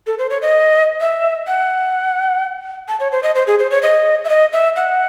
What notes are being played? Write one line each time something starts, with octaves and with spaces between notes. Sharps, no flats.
A4
C5
C#5
D#5
E5
F#5
A5
C#5
C5
D#5
C5
G#4
C5
C#5
D#5
E5
D#5
E5
F#5